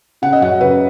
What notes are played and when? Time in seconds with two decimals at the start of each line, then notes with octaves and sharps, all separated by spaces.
0.22 C#3 F#5
0.33 D#5
0.41 F#2 F#5
0.61 C#3 B4